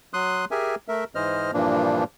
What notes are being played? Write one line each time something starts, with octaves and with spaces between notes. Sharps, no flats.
F#3 C6 D#6 F#6
G4 G#4 A#4 E5 G#5
A3 A#4 E5
G#2 E3 C5 D#5 F6
G2 A#2 E3 F3 A#3 D4